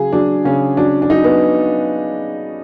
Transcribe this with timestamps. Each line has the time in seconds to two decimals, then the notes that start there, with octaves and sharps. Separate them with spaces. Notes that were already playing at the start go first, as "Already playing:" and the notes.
Already playing: C#3 F#3 G#4
0.13 F#3 D4
0.45 C#3 C#4
0.77 F#3 D4
1.02 D4
1.10 F#3 D#4
1.24 B3